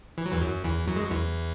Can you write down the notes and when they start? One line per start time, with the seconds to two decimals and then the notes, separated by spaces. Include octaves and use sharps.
0.18 E3
0.26 F#3
0.32 E2 E3
0.41 F#2 F#3
0.64 E2 E3
0.87 F#2 F#3
0.96 G#3
1.04 F#3
1.11 E2 E3